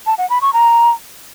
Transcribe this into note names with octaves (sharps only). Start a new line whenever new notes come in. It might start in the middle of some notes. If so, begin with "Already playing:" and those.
A5
F#5
B5
C#6
A#5